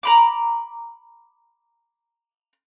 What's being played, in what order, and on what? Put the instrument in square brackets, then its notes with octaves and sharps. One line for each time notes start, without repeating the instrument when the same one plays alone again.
[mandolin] A#5 B5 D6